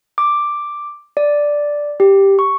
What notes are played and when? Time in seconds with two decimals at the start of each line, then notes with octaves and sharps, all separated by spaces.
0.18 D6
1.17 D5
2.00 G4
2.39 C#6